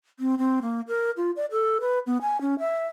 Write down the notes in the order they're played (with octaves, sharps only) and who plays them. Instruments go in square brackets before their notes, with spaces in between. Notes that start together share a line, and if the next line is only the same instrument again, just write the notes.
[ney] C4
C4
A#3
A#4
F4
D5
A4
B4
B3
G#5
C#4
E5